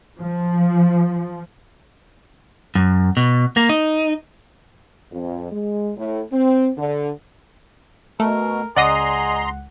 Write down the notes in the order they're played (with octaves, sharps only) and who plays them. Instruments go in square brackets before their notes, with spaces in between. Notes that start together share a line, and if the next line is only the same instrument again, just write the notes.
[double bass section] F3
[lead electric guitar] F#2
B2
A#3
D#4
[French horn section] F2
G#3
A2
C4
D3
[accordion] B2 [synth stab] A3 [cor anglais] A#4
[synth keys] C#2 F#5 [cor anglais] G#4 [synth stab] D5 D#5 D#6 [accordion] A#5 C6